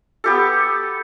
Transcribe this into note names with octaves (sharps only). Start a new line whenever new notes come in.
B3 G4 A4